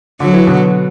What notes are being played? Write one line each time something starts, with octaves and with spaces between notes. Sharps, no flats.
D3 F#3
E3
B2 D3